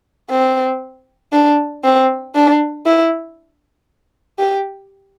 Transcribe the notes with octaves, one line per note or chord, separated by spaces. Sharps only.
C4
D4
C4
D4
E4
G4